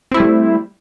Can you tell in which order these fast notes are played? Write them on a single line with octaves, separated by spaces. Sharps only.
C4 E4 A3 G3